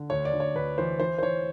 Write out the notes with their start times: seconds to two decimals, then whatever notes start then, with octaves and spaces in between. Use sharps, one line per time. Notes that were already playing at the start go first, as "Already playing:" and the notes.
Already playing: D3
0.10 D2 C#5
0.25 D5
0.33 D2
0.40 C#5
0.55 D2 B4
0.78 E3 C5
1.00 E3 C5
1.18 C5
1.22 E3 C#5